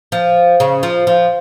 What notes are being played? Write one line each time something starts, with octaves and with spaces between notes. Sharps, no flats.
F3
C#3
F3
F3